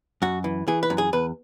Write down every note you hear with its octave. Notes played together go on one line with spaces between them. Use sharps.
F#2 F#4
E3
E3 G#4
B4
F#2
G#4
E2 B4